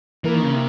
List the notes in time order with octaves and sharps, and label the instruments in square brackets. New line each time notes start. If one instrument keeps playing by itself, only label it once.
[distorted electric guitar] E3 [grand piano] A#3 A#4
[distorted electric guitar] D#3
C#3
C3